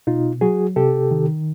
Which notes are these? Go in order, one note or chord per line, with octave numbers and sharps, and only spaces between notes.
B2 D#4 F4
F#3 F#4 G#4
C3 G4 A4
D#3